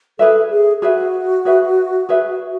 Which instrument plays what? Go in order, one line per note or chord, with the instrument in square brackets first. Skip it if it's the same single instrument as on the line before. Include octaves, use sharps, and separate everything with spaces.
[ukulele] G#4 B4 E5 [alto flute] A4
[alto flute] G#4
[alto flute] F#4 [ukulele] G#4 B4 E5
[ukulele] G#4 B4 E5
G#4 B4 E5